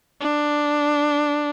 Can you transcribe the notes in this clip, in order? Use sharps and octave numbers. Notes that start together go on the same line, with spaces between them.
D4